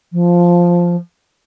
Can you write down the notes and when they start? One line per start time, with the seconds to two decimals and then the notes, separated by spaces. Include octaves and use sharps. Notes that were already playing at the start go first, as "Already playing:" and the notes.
0.13 F3